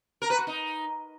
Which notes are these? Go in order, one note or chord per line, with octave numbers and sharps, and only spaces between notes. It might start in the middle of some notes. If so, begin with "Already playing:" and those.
A#4
B4
F#4
D#4